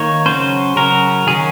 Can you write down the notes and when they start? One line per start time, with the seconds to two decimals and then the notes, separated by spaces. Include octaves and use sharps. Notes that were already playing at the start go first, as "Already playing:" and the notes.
Already playing: D#3 A#3 D#4 C#5
0.26 C#3 F#3 C#4 C5
0.76 C#3 F#3 C#4 A#4
1.27 D#3 F#3 C#4 G#4